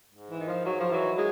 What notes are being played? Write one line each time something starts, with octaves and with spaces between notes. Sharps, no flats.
G#2
E3
D#3
F3
G#2 F#3
F3
D#3 E3 F#3
F#3 G#3